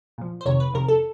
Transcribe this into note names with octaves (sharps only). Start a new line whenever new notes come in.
A#2 F3
C5
F2 C3 D#3 C#5
B4
F2 C3 D#3 A#4
A4